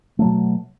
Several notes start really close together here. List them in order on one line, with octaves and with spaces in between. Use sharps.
A3 F#3 B2